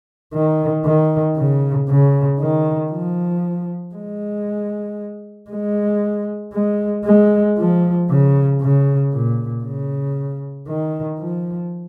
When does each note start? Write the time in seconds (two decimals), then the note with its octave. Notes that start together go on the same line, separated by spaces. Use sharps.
0.33 D#3
0.85 D#3
1.37 C#3
1.89 C#3
2.39 D#3
2.92 F3
3.95 G#3
5.50 G#3
6.53 G#3
7.05 G#3
7.58 F3
8.09 C#3
8.61 C#3
9.13 A#2
9.64 C#3
10.68 D#3
11.19 F3